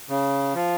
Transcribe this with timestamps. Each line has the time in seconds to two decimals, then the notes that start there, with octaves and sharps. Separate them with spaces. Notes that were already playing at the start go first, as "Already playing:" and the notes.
0.09 C#3
0.54 F3